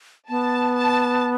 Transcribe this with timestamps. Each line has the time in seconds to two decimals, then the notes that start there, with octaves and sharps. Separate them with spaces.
0.29 B3 A5
0.76 A5